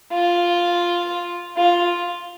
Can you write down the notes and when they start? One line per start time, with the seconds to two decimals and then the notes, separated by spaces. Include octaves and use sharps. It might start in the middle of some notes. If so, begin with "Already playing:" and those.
0.13 F4
1.57 F4